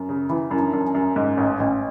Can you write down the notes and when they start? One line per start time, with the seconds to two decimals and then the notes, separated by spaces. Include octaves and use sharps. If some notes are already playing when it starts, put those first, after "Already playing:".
Already playing: F#2
0.09 C#3
0.29 E3 E4
0.51 F#2
0.59 D4
0.73 F#2
0.87 C#4
0.95 F#2
1.16 G#2
1.37 A1
1.60 A1